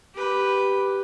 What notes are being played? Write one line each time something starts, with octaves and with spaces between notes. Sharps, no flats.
G4 B4